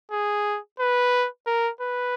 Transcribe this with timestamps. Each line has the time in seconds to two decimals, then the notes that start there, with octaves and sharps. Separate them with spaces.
0.11 G#4
0.80 B4
1.46 A#4
1.80 B4